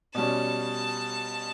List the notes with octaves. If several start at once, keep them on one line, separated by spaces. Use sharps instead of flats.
B2 G3 C#4 A5